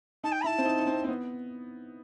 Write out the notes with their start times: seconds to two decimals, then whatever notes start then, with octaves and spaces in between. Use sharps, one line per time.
0.24 D#4 A5
0.32 G5
0.41 B5
0.44 E4 A5
0.58 C4
0.65 D#4
0.79 D#4
0.87 C4
1.04 C4
1.08 B3